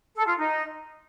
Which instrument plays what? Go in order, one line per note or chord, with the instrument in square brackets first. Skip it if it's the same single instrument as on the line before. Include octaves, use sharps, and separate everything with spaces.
[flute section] A4
F4
D#4